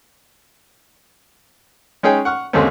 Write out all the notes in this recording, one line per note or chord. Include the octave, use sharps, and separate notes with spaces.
G#3 C#4 D#4 G#4 C#5 G5
F#5 C#6 F6
D#2 D3 G#3 A3 C4 C#4